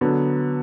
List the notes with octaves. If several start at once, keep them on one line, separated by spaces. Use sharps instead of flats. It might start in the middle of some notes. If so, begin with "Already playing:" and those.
D3 F#3 B3